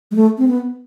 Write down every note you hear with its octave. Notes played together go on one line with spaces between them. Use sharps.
G#3
A3
C4
B3